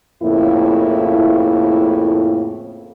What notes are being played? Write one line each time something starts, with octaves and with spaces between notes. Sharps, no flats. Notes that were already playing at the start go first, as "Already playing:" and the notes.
F2 A2 C#3 A#3 E4